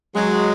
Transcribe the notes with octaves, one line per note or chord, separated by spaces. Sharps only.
F#3 G#3